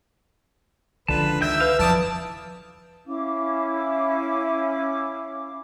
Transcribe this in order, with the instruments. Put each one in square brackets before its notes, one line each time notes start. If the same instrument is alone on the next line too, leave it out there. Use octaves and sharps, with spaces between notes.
[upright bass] C#2 [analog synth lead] D3 [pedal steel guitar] F3 F4 A5 [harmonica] B4
[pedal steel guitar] D#3 G6 [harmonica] E5
[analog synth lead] B4 [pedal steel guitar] F5
[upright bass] F2 C#3 [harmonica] E4 A5 [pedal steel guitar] F4 D5 D#6
[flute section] C#4 E4 F5 D6